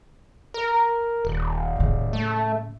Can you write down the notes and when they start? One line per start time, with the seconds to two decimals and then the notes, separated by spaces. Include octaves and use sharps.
0.54 A#4
1.25 D#1
1.76 A2 C#3
2.13 A3